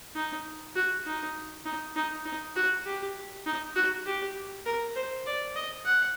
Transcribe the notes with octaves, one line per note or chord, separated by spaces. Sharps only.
D#4
F#4
D#4
D#4
D#4
D#4
F#4
G4
D#4
F#4
G4
A#4
C5
D5
D#5
F#5